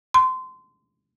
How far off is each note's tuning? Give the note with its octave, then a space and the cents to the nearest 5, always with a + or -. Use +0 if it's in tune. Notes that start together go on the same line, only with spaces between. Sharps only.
C6 -25